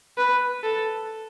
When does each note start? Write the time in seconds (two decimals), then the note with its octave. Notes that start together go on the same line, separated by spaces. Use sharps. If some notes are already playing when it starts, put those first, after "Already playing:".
0.18 B4
0.63 A4